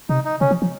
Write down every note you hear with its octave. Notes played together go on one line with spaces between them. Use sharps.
C3 D#4
D#4
C#3 C#4
F3
F3